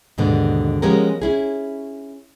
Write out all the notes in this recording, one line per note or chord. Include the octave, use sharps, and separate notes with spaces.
D#2 G#2 B2 D3 B3
F3 G#3 B3 C#4 G4 A#4
C#4 E4 G#4